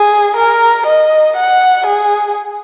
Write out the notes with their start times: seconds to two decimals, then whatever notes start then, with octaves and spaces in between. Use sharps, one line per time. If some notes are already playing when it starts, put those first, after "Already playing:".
Already playing: G#4
0.36 A#4
0.86 D#5
1.36 F#5
1.86 G#4